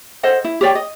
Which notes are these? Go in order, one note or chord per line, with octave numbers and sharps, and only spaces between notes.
A4 C5 D#5 F#5
E4
G4 C#5 D5 G5
D#5